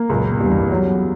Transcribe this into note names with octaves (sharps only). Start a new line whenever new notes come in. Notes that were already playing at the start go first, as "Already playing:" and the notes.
Already playing: A#3
C#2 F#2 A#2
E2 G2 G3
F#2 F#3